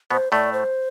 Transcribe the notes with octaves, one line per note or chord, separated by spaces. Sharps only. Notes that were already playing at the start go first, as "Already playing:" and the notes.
B2 B3 C5
A2 A3 D5
C5